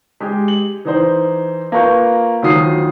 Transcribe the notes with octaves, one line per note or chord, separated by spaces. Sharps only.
G#3 G4
F#7
E3 D#4 C5
A#3 F4 B4 A#5 C#6 G6
D2 D#3 F3 F#3 D#6 C7